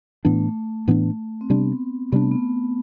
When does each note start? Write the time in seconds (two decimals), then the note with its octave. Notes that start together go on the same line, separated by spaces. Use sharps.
0.25 A2 E3 A3 B3 D4
0.88 A2 E3 B3 D4
1.41 C4
1.50 C3 G3 B3 D4
2.12 C3 G3 B3 D4
2.22 A3
2.32 B3